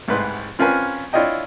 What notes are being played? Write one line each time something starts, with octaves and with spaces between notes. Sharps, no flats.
C2 G#2 B4 C6
C4 C#4 F4 A#4 B4 G#5
D4 E4 F4 C#5 D#5 G5